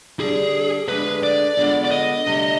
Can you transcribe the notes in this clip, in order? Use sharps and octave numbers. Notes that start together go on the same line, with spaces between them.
D3 G3 D4 G#4
D2 D3 G#3 D4 G#4 B4
D5
D3 G#3 B3 F4
D5
D#5
D2 C3 G3 D4